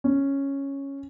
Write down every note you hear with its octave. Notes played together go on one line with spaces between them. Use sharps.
C#4